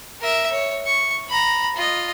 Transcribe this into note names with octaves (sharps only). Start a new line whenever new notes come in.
A#4 E5
C#5
C#6
A#5 B5
F4 D#5